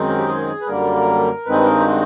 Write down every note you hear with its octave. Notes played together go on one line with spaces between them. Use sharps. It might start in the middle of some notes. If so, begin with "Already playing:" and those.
Already playing: F#2 D#3 G#3 C4 D#4
A#4
G4
G#4
B4
F#2 D3 G3 A#3 A#4
G2 D#3 G#3 C4 D#4 B4
A#4
G4
F#4